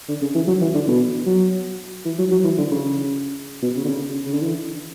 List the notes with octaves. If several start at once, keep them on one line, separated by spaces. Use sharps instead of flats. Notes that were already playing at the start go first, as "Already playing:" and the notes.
D3
C#3
E3
F#3
E3
D3
B2
F#3
E3
F#3
F#3
E3
D3
C#3
B2
C#3
D3
C#3
C#3
D3
E3